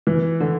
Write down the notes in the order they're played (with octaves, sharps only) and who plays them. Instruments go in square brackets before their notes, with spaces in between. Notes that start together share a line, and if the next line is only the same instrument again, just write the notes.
[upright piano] E3
D3